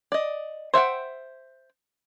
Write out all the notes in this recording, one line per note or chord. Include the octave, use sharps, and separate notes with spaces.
D5 D#5
C5 E5 F#5 G5